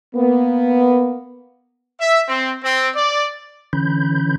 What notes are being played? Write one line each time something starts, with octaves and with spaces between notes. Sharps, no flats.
A#3 B3
E5
C4
C4
D5
D3 E3 C#4 B5 G6